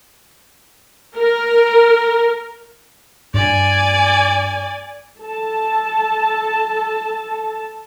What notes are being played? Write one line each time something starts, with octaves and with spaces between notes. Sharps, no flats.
A#4
G2 D5 G#5
A4 A5